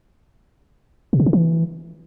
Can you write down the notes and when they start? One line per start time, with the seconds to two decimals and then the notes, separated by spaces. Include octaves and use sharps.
1.13 B2
1.20 C3
1.26 D3
1.33 E3